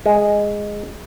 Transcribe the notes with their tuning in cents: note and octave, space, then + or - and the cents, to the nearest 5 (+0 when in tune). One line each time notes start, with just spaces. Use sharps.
G#3 -5